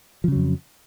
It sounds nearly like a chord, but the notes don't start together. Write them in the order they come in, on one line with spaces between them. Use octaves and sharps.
F3 C#3 F#3 F2